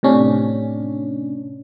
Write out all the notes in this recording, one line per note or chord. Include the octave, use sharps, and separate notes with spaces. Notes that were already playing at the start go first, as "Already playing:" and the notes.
A2 C3 C#4 D4